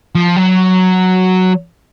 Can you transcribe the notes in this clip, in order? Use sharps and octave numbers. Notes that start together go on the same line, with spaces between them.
F3
F#3